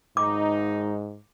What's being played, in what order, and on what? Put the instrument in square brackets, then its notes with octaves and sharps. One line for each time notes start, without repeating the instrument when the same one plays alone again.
[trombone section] G#1 D#4 [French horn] G#2 [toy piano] D6